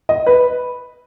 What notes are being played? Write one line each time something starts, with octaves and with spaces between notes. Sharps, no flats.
D#5
B4